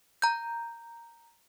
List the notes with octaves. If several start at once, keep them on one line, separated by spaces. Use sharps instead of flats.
A#5 G6